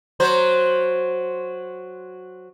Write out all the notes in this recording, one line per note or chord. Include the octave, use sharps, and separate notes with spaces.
F#3 C5